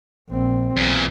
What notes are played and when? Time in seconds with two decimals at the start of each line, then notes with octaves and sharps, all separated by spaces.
0.30 A#1 C4
0.77 B1 E2 A#2